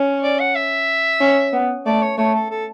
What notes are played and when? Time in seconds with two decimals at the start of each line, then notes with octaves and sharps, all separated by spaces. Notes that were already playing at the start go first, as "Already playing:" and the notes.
Already playing: C#4
0.23 D5
0.39 F#5
0.55 E5
1.21 C#4
1.53 B3
1.86 A3 D5
2.02 C#5
2.18 A3 C#5
2.34 A4
2.50 A4